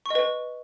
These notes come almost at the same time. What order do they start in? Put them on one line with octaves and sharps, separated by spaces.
C#6 D#5 B4